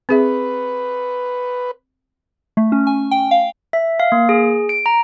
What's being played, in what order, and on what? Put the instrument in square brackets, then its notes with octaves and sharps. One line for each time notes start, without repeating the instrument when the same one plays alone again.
[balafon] C4 G#4 E5 [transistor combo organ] B4
[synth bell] A3
C#4
G#5
G5
F5
[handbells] E5
F5
A#3
G#4
D7
A#5